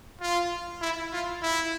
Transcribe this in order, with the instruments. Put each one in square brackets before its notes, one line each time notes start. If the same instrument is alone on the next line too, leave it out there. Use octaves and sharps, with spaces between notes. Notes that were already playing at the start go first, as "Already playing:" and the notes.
[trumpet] F4
E4
F4
E4